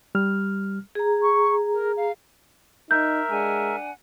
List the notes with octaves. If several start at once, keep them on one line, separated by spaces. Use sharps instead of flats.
G3 F6
G#4 A#5
C#6
A#4
F5
D#4 A#4 E5 G6
G#3 D4 F#5 G#5